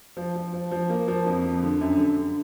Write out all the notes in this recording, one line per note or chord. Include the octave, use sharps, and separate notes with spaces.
F3
F3
F3
F3
A#3
F3
F2
F2
D3
F#2
D3
D3